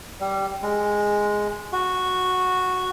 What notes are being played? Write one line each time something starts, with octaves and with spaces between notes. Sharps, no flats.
G3
G#3
F#4